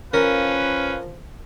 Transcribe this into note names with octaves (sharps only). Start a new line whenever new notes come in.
F3 C#4 A#4 B4 F5